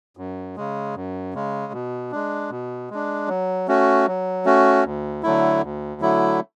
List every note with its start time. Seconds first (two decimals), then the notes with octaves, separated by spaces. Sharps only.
0.17 F#2
0.56 C#3 G#3
0.95 F#2
1.34 C#3 G#3
1.73 B2
2.11 G#3 D4
2.51 B2
2.90 G#3 D4
3.28 F#3
3.68 A3 C#4 F#4
4.07 F#3
4.45 A3 C#4 F#4
4.84 D2
5.23 D3 F#3 A3 E4
5.62 D2
6.01 D3 F#3 A3 E4